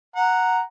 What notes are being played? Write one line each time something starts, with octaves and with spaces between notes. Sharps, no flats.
F#5 A#5